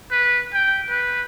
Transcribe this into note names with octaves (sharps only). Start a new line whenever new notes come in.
B4
G5
B4